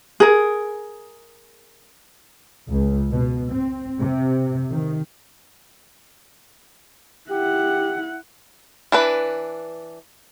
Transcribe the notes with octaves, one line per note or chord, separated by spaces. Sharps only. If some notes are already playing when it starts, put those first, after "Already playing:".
G#4 A#4
C#2
B2
C4
C3
D#3
E4 G4 F#5
E3 D4 B4